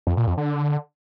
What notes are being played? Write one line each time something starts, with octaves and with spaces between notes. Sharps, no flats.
F2
A#2
F2
D3